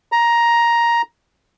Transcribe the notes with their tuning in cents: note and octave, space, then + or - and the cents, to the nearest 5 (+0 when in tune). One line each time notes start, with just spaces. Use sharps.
A#5 +10